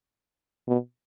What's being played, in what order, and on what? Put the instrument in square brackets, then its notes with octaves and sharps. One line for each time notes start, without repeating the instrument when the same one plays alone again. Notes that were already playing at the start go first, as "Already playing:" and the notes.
[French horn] B2